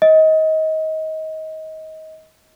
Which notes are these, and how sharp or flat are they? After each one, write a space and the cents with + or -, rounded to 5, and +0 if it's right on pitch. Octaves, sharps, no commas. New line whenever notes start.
D#5 +25